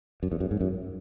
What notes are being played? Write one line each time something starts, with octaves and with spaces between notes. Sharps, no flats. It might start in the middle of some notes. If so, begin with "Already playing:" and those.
F#2
E2
F#2
G#2
F#2